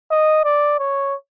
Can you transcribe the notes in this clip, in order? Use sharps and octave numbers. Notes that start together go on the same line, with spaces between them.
D#5
D5
C#5